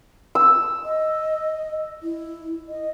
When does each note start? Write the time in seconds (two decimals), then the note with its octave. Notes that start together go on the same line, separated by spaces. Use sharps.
0.35 E6
0.84 D#5
2.02 E4
2.68 D#5